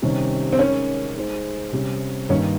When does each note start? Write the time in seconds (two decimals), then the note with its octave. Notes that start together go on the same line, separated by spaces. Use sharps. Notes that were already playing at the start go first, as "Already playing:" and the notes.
0.02 C3 D#3 G3 C#4 G4
0.52 C4
0.59 G#3 C#4 D#4 A#4 C#5
1.16 G#3 D#4 G#4 C5
1.72 C3 G3 C#4
2.29 G2 D#3 A#3 C#4